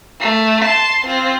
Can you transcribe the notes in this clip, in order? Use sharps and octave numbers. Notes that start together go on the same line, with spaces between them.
A3
A5 C6
C4 F4